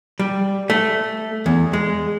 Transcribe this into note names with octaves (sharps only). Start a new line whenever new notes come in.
G3
A3
E2
G#3